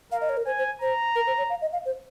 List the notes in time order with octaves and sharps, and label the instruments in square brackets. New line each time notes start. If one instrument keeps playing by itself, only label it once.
[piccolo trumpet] A#4 [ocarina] F5
[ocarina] D#5
C#5
A#4
[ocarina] C5 [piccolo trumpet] G#5
[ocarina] C5
[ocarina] C5 [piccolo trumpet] A#5
[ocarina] A#4
C5
C#5
F5
D#5
F5
C5